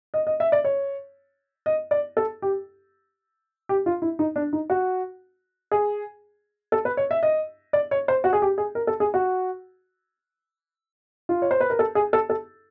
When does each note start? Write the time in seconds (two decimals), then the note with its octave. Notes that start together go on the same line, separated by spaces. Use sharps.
0.14 D#5
0.27 D#5
0.40 E5
0.52 D5
0.65 C#5
1.66 D#5
1.91 D5
2.17 A4
2.42 G4
3.69 G4
3.86 F4
4.02 E4
4.19 D#4
4.36 D4
4.53 D#4
4.70 F#4
5.72 G#4
6.72 A4
6.85 B4
6.97 C#5
7.11 E5
7.23 D#5
7.73 D5
7.91 C#5
8.08 C5
8.24 F#4
8.33 G#4
8.42 G4
8.58 G#4
8.75 A#4
8.87 A4
9.00 G#4
9.14 F#4
11.29 F4
11.42 C#5
11.51 C5
11.60 B4
11.70 A#4
11.79 A4
11.95 G#4
12.13 A4
12.30 A4